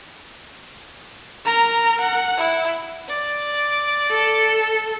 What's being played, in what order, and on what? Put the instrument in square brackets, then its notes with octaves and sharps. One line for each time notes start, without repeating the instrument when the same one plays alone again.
[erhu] A#4 [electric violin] A#5
[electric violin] F#5
[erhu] E4
[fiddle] D5
[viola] A4